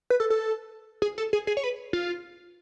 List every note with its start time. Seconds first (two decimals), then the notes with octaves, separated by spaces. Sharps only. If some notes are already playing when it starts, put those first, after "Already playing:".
0.10 B4
0.20 A4
0.30 A4
1.02 G#4
1.18 A4
1.33 G#4
1.47 G#4
1.57 C#5
1.63 B4
1.93 F4